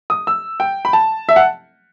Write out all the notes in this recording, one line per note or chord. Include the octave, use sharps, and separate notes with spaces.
D#6
E6
G5
B5
A5
E5
F#5